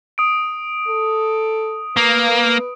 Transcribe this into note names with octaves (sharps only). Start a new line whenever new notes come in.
D#6 D7
A4
A#3 B4